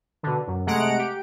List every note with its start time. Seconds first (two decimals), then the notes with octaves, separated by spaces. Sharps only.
0.23 B2 D3
0.47 F#2
0.66 C3 G#3 A3 F#5 A#5 D7
0.99 G4